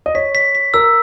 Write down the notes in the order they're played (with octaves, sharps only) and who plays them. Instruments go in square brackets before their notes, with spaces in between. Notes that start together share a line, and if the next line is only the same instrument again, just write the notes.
[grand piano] D#5
[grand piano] C#5 [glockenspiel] B6
[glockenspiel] B6
B6
[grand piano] A#4 [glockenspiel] E6